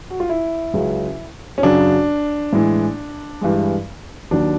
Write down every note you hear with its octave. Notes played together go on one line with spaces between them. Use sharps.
F#4
F4
E4
C#2 C#3 F#3
C#4
F#2 C#3 F#3 D4
A2 E3 G#3
G2 E3 G#3
D#2 D#3 F#3 D4